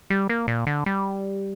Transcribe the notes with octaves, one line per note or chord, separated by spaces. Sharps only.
G3
A#3
A#2
D3
G3